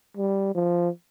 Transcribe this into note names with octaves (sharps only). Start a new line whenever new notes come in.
G3
F3